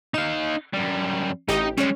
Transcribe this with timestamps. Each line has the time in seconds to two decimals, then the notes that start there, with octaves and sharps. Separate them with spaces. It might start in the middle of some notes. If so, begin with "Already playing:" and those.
0.14 D#4 F5 E7
0.73 F#2 G3
1.48 A1 D#4 G4 D#5
1.78 G3 G#3 C#4 C#5